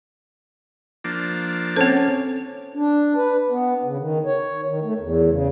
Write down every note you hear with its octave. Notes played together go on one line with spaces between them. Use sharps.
F3 A#3 D4
C4 C#4 A4 C5
D4
B4
B3
C#3
D#3
C#5
D#3
A3
E2
C#3